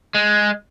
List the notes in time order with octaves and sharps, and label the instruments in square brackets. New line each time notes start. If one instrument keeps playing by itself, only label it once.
[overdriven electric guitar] G#3